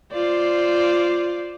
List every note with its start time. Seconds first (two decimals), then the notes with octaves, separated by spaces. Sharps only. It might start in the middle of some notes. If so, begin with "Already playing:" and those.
0.13 F4 C5 D5